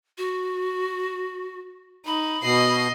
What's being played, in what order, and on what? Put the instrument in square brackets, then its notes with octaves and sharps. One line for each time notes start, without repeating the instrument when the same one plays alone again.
[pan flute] F#4
[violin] D#4 [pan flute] B5
[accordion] B2 [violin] D#5 C7